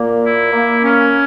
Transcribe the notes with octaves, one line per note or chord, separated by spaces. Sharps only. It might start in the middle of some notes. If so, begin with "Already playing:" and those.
Already playing: A#2 A#3
E4
A#3
C#4